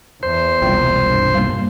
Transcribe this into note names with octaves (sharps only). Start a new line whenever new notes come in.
E2 C5
E1 C2 A#2 G3 G5
G2
G3 A#3